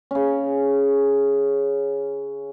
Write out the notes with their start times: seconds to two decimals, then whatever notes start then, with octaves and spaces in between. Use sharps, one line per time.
0.11 C#3 C#4